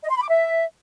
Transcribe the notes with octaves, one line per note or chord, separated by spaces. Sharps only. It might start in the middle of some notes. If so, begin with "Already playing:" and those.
D#5
C6
B5
D6
E5